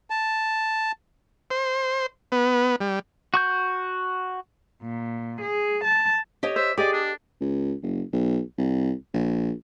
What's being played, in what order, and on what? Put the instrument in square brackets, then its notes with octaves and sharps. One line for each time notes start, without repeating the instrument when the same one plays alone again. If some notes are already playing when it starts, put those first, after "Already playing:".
[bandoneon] A5
[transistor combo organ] C5
B3
G3
[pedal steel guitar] F#4 C#6 G6
[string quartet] A#2
G#4
A5
[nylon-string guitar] G4 C#5 D#5
[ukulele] C5 [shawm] E5
[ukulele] G4 D#5 [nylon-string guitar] G#4 [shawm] D5
[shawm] D4
[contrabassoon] C#2
F#1
B1
C2
A#1